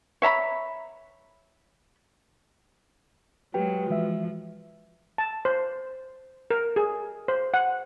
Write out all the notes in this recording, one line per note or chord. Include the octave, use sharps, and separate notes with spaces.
C#5 E5 A#5 B5
F#3 G#3 F#4 G4 B4 G5
E3 F3 G#3 E5
A5
C5
A#4
G#4
C5
F#5